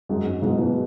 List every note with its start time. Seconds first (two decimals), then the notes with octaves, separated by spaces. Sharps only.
0.09 F#2 G#3
0.26 G#2
0.42 G#2 B2 G#3
0.58 G#2 B2